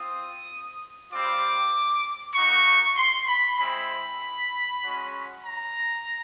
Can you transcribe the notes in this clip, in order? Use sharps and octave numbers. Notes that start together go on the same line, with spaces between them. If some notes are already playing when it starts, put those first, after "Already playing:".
Already playing: C4 F4 D#6
G3 C4 F4 D6
A#3 D#4 F#4 C#6
C6
B5
G#3 C4 E4 B5
G#3 C#4 F#4
A#5